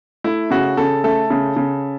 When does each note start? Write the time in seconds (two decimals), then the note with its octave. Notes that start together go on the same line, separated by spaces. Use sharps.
0.24 A3 E4
0.51 C#3 F#4
0.77 C#3 A4
1.04 A3 A4
1.30 C#3
1.57 C#3